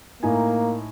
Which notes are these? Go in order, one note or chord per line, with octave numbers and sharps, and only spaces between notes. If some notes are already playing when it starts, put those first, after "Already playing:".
A2 A#3 D#4 G#5